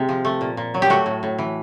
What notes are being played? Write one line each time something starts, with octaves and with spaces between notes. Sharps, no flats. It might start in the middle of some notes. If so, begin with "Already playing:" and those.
Already playing: C3 G#3
F3
A3
A#2
A#2
F#3
G4
A3 F#4
A2
A2
E3